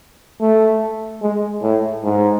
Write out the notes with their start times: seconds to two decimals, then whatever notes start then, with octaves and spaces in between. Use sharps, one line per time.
0.41 A3
1.22 G#3
1.63 A2
2.04 G#2